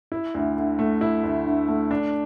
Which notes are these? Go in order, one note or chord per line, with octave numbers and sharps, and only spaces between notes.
E4
D2
D3
A3
E4
D2
D3
A3
D4